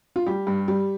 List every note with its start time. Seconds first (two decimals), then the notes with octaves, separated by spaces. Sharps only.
0.16 F4
0.27 G3 G4
0.47 G2
0.68 G3